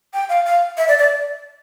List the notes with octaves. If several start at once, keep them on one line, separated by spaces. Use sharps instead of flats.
G5
F5
F5
E5
D5
D5